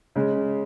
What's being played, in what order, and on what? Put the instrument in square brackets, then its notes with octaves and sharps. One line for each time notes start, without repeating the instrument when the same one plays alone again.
[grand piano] C#3 G#3